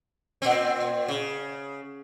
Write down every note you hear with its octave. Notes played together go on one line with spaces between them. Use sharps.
A#2 C4
C#3